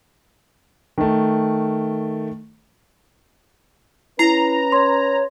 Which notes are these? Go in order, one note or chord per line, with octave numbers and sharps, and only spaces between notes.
D#3 A3
C#4 E4 B4 A#5 C7
C#5 C6